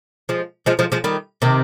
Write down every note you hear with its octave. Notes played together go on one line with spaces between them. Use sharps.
F3 G#3
F3 G#3
F3 G#3
F3 G#3
D#3 G3
C3 D#3